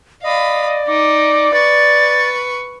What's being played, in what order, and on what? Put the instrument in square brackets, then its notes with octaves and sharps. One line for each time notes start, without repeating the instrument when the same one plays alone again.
[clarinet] D5 [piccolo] D#5 [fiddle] F5 B5
[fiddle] D#4 [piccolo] D6
[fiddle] B4 C#6 [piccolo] A6